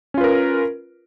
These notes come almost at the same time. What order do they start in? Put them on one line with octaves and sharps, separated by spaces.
C#4 F4 B4 A#4